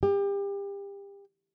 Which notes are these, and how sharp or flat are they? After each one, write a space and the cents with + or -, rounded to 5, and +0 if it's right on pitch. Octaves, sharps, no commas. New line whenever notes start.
G4 +30